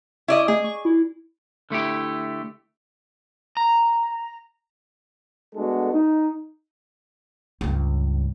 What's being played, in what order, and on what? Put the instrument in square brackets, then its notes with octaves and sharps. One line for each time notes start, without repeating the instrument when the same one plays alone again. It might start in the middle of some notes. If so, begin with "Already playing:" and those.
[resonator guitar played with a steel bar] E4 D5 D#5 [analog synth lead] C#6
[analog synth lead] A3 [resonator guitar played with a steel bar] G#4
[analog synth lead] C#6
E4
[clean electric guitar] D3 A3 E4 G4
[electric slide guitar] A#5
[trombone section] G#3 A3 B3 D4 F#4 A4
D#4
[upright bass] C#2 G2